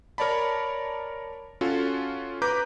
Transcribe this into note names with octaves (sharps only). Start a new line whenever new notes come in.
A#4 C#5 D5 A5 B5
C#4 F4 F#4 A4
B4 A#5 D6 G6